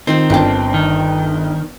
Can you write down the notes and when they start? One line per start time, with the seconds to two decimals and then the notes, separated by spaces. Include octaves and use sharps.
0.07 D#3 C4 F4 C5
0.30 G1 D4 F4 G5
0.74 D#3